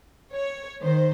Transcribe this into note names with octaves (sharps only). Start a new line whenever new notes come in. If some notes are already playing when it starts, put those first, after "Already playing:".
C#5
D#3 C5